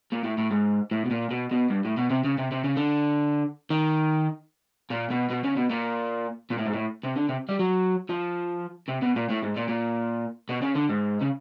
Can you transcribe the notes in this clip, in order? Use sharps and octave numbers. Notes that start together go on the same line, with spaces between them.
A#2
A2
A2
G#2
A2
B2
A#2
B2
B2
G2
A2
B2
C3
C#3
C3
C3
C#3
D3
D#3
A#2
B2
B2
C#3
B2
A#2
A#2
A2
G#2
A2
C3
D3
C3
G3
F#3
F3
C3
B2
A#2
A2
G#2
A#2
A#2
B2
C#3
D3
G#2
C#3